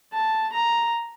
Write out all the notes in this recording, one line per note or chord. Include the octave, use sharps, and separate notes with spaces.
A5
A#5